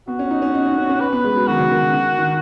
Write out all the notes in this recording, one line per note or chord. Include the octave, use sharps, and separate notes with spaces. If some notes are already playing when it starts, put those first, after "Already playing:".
B3 F#4
C#4
D#4
C#4
D#4
C#4
C#4
C#4
B4
B3
G#3
F#3
D#3 F#4
C#3
D#3
C#3
D#3
D#3